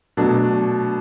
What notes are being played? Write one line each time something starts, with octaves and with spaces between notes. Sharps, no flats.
B2 F#3 A3 D4